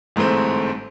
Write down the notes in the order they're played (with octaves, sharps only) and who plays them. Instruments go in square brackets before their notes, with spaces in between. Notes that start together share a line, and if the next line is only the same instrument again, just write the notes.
[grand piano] G1 G#2 E3 A3 C4